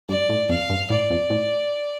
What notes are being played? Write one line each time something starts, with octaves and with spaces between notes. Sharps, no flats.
G2 D5
A2
F2 F5
G2
A2 D5
F2
A2